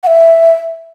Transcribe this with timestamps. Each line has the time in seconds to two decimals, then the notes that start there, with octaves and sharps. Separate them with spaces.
0.03 F#5
0.07 E5